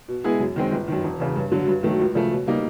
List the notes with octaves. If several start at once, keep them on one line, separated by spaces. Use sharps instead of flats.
B2
G#3 B3 E4 G#4
F#2
D#3 G#3 C4
G1
F#2 D#3
E1
E2 C#3
G2
D3 F#3
G2
D#3 F#3 A3
C#2
C#3 F3 A3
B2
G3 A#3 D#4